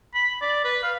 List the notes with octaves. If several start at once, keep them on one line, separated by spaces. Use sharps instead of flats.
B5
D5
B4
F5